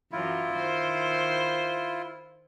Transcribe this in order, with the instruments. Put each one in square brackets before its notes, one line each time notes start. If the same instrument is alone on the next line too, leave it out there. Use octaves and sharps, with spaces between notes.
[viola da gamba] F#2 E3 F#3 [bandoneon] E4 F4
[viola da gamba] D#3 C5